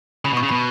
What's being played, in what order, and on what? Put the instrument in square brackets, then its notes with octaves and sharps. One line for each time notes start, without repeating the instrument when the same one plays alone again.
[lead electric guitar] C#3 [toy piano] B5
[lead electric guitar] B2
[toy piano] C#6
[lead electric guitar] C#3
[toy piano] B5
[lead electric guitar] B2